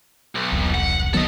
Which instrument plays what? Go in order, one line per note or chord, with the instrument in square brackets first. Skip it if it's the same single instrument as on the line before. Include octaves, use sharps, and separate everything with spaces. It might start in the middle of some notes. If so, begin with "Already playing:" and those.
[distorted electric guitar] B1
[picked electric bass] E1 C2
[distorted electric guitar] F#5
[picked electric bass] D#3 F#3 B3 [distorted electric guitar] A4 D#5